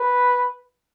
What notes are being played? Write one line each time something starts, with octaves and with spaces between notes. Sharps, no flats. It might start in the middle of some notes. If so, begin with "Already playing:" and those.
Already playing: B4